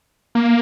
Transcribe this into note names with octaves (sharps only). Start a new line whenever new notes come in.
A#3